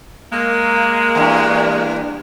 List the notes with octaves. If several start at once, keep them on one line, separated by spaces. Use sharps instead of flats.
G#3 A#3
E2 G2